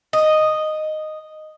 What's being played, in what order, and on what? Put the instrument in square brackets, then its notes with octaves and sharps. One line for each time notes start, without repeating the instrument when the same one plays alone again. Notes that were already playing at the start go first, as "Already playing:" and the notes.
[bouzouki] D#5